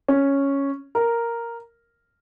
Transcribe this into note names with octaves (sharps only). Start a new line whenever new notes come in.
C#4
A#4